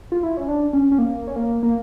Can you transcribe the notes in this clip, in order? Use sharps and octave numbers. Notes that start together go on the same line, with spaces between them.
F4
E4
C#4
D4
C#4
C#4
A#3
C#4
A#3
A#3